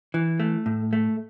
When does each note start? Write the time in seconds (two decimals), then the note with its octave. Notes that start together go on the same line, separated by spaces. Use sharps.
0.14 E3
0.40 A3
0.66 A2
0.93 A3